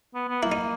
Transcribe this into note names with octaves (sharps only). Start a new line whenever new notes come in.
B3
B3
A#3 E4
D#4